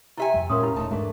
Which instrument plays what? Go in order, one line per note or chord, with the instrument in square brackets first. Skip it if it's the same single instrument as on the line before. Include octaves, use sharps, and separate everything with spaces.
[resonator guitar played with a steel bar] C3 E5 G#5 [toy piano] E4 G4 G5
[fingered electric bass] F2 G3
[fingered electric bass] A#2 G#3 [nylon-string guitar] C#4 F4 [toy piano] A#4 C6 D#6
[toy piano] E4 G4 B5
[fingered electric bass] E1 [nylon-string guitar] A3 D#4 E5 [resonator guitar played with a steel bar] A5
[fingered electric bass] G#2 G#3 [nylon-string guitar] E3 A3 D4